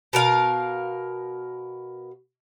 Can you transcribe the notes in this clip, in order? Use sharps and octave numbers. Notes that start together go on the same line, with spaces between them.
B2 A#4 F5